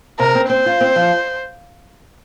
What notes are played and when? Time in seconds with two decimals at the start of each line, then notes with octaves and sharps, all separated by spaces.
0.19 C3 A#4
0.35 C4
0.50 C4 C5
0.66 F4
0.81 C4
0.96 F3